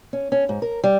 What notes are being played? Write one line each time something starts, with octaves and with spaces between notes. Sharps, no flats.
C#4
C#4
G#2
A#4
G3